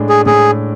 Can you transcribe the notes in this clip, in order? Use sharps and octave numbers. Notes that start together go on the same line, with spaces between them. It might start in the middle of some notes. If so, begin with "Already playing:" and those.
Already playing: A2 G#3 D4
G#4
A2 G#4